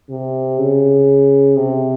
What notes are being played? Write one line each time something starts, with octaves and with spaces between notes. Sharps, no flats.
C3
C#3
C3